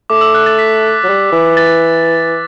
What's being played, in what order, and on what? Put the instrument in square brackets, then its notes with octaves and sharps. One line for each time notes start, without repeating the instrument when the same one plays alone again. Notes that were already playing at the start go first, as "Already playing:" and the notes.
[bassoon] A3 [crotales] D6
[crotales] E6
F#6
A6
B6
[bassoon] F#3
G3
E3
[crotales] A6